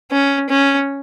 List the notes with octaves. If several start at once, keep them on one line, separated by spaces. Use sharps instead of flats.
C#4
C#4